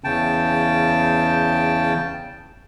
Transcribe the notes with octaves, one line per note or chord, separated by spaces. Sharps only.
E2 C#3 G5 A5